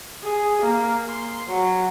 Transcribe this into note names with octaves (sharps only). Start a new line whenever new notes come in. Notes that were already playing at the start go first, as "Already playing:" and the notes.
G#4
A#3
C6
F#3